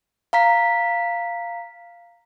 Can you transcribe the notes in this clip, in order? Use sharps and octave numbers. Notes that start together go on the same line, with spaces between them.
F5 A#5 B6